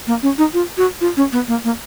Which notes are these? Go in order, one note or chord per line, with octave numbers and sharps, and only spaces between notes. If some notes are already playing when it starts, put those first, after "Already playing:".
A#3
C#4
D#4
F4
F#4
F4
C#4
B3
A#3
A#3